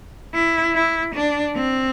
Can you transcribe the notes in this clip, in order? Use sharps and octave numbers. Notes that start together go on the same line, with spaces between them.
E4
E4
D4
C4